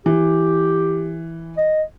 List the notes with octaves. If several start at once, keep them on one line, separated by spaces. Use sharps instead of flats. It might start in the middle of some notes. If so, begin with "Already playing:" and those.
E3 G4
D#5